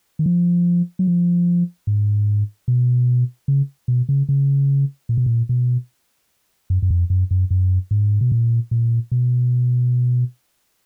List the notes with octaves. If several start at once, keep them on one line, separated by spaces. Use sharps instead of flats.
D#3
F3
F#3
F3
G#2
B2
C#3
B2
C#3
C#3
A#2
B2
A#2
B2
F#2
F#2
F2
F#2
F#2
F#2
G#2
B2
A#2
A#2
B2